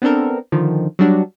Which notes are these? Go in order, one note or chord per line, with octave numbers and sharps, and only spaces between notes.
B3 C4 D4 A4 A#4
D3 D#3 F3
F#3 G3 D4 F#4